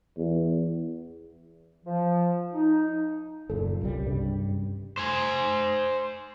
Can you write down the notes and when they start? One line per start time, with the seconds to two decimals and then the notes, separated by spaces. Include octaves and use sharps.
0.18 E2
1.85 F3
2.53 D#4
3.50 F#1 A#2 A4
3.81 C2 C#3 G3
4.06 G2
4.98 C5 G#5